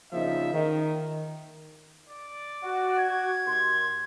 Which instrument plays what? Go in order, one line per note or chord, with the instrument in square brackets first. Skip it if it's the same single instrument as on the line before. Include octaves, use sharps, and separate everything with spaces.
[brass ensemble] A#1 A#2 C#3 F3 D#4 E5
D#3
[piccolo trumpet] D5
[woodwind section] F#4
[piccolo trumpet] G#6
[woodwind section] D#2 C6